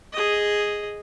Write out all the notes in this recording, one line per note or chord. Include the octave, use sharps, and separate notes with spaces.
G#4 D#5